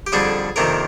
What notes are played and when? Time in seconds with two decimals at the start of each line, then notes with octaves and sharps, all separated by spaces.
0.07 G4
0.12 F2 D3 G3 D4 G#4
0.56 F2 C3 D#3 A#3 D4 A#4